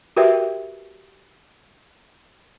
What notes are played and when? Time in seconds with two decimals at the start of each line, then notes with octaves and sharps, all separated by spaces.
0.17 F#4 G4 A#4 B4 E5 G5